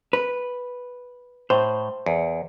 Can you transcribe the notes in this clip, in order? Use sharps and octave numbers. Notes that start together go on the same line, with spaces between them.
B4
A2 C5
E2